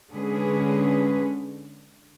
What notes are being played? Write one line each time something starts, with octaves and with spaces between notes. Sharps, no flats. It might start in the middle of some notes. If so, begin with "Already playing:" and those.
D3 G#3 C#4 G#4 B4